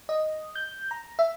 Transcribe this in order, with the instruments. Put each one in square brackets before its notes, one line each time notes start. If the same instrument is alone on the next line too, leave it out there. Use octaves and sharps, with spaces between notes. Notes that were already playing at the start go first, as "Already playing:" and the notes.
[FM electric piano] D#5
G6
A#5
E5